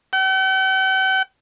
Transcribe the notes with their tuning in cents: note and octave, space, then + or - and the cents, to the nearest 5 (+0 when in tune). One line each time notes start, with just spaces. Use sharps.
G5 -45